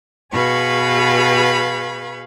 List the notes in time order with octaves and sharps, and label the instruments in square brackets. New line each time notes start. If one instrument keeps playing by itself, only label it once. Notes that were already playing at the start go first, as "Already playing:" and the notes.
[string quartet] B2 G#4 B4 F5 B5 C#6